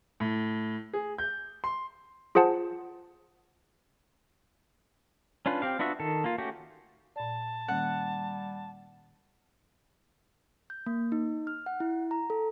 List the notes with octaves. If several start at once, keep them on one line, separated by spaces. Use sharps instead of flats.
A2
G#4
G6
C6
F4 G#4 C5 F#5 A5
C#4 D4 F4 B4
C4 G4 F5
B3 D4 F4 F#4 E5
D#3 A4
A#3 F4
A3 C#4 F#4 G4
A#2 D5 A5
D#3 G3 A#3 C#4 F#5
G6
A#3
D#4
F6
F#5
E4
A#5
A4